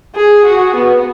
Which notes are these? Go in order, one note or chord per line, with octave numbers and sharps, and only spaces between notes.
G#4
F#4
B3